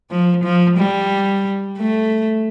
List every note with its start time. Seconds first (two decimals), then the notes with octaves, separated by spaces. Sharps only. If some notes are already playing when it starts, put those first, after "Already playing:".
0.11 F3
0.44 F3
0.77 G3
1.78 A3